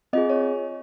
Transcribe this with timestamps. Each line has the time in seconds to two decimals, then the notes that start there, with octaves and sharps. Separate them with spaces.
0.13 C4 F4 G#4 D#5
0.30 C#5